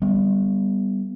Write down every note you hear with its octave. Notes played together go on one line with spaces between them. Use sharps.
G3 B3